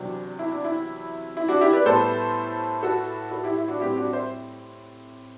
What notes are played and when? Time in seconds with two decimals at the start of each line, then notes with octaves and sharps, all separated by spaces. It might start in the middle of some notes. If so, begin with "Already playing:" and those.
Already playing: E2 C3 F#3 C4 D4
0.39 E4
0.52 D4
0.65 E4
1.37 E4
1.48 D4 F#4
1.61 E4 G4
1.73 B4 D5
1.85 A2 G3 B3 A4 C5
2.83 F#4 A4
3.31 F#4 A4
3.43 E4 G4
3.57 E4
3.68 D4 F#4
3.80 A2 G3 C4 E4 G4
3.96 D4 F#4
4.13 C5 E5